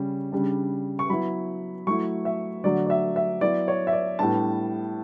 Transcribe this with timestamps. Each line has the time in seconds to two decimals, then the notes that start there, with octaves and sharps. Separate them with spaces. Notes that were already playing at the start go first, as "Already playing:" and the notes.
Already playing: C#3 G3 C#4
0.32 C#3 G3 D4
0.99 C#6
1.10 F#3 B3 E4 B5
1.87 F#3 A3 E4 C#6
2.25 E5
2.64 D3 F#3 A3 D5
2.86 D5
2.90 E5
3.16 E5
3.41 F#3 B3 E4 D5
3.68 C#5
3.87 E5
3.93 D5
4.19 A2 G3 B3 D4 A5